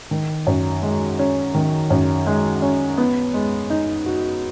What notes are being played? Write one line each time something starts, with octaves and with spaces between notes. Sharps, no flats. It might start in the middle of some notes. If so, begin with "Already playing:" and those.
D#3
F#2
G#3
C#4
D#3
F#2
G#3
C#4
B3
G#3
D#4
F#4